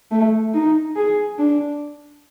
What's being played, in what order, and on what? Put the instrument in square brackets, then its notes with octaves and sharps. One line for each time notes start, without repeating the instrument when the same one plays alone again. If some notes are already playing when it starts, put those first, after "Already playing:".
[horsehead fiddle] A3
D#4
G#4
D4